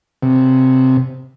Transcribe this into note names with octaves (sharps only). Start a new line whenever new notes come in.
C3